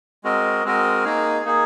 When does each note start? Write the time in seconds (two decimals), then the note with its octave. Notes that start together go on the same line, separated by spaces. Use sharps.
0.24 G#3 C4 F#4 A#4 D#5
0.65 G#3 C4 F#4 A#4 D#5
1.05 A#3 D#4 G#4
1.45 A#3 D#4 G#4